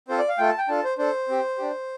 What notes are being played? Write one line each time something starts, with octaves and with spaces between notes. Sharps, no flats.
C4 F4 A4 C5
D5
F5
A3 F4 A4 G5
A5
G5
D4 F4 A4 A5
C5
D4 A4 C5
C4 G4
D4 G4